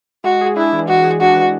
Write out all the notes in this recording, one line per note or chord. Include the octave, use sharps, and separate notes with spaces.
G#3 F#4
G#4
D4 E4
E3
G#3 F#4
G#4
D4 F#4
E3